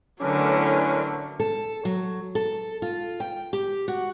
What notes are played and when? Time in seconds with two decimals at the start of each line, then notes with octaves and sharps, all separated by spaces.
0.21 A2 D3 F#3 C#4 D4 A#4 B4
1.40 A4
1.85 F#3
2.35 A4
2.82 F4
3.20 G5
3.53 G4
3.88 F#4